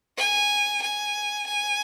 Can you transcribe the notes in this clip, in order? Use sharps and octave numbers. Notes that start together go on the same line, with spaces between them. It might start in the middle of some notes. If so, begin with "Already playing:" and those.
G#5
G#5
G#5